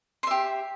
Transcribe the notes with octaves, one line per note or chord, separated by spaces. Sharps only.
G4 E5 C6